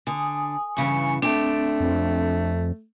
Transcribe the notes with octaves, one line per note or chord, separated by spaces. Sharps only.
D3 G#5 D#6
G2 C#3 E3 G#5 C#6
A3 C4 D4 G5
F2